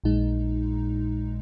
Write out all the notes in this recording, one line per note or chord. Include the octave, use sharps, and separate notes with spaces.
A#1 A#2 G#3 D#4